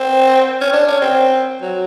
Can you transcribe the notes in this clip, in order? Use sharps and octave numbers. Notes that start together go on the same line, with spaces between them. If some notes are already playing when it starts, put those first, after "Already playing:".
Already playing: C4
C#4
D4
C#4
C4
F#3